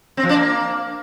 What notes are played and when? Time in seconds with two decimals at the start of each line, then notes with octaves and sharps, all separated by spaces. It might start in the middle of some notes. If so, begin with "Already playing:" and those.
0.17 C4
0.23 F3
0.29 D4
0.35 A#3